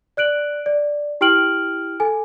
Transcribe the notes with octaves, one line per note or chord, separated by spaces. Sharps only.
D5 F#6 D7 F#7
D5
E4 G4 G5 F6 D7 F#7
A4 G#5